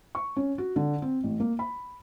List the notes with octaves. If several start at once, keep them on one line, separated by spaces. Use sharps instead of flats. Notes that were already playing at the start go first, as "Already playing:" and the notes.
C#6
C#4
F#4
D3
C4
A1
A#3
B5